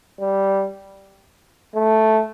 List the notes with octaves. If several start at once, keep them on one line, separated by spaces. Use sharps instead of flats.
G3
A3